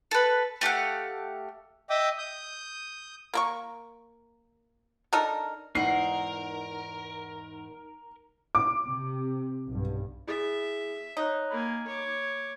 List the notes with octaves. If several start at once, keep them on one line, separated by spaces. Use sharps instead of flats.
A4 B4
A3 G4 F5 F#5
D#5 E5 G5 D6 D#6
D#6 G6
A#3 A#4 C#6
D4 D#4 A4 A#4
E2 G#2 D#4 A#4 F#5 C7
D6
C3
B1 G2
E4 G#4 E5
D#4 C#5 F#6
A#3 G#5 B5
C#5 D6